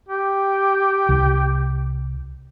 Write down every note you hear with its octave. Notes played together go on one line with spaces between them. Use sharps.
G4
C2